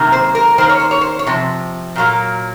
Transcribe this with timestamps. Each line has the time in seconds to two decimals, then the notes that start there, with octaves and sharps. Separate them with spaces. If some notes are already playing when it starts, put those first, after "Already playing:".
Already playing: C3 D#3 F#3 A#3
0.12 C5
0.35 A#4
0.58 D#3 A#3 C5
0.69 C#5
0.80 C5
0.91 C#5
1.01 C5
1.19 C#5
1.27 C3 F3
1.96 A#2 F#3 A#3